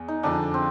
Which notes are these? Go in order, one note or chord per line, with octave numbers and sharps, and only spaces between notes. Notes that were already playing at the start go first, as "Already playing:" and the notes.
Already playing: E2 G#4
D#4
F2 D3 F3 D4
C4